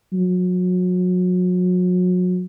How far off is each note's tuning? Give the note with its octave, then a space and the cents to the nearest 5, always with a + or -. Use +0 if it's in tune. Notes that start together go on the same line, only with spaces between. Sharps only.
F#3 -35